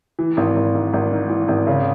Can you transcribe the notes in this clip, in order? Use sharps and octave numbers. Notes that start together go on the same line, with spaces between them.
E3
G#1
G#1
G#2
G#1
G#2
E3
G#1
C#3